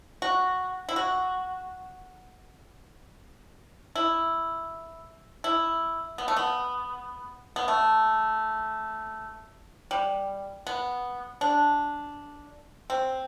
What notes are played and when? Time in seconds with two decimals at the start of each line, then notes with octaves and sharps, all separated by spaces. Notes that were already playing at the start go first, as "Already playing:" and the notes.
0.22 F#4
0.89 E4
0.96 F#4
3.95 E4
5.44 E4
6.18 B3
6.28 A3
6.36 B3
7.56 B3
7.68 A3
9.91 G3
10.67 B3
11.41 D4
12.90 C4